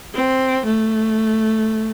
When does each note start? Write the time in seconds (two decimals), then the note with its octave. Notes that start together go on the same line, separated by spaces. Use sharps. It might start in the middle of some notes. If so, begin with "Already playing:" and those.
0.15 C4
0.65 A3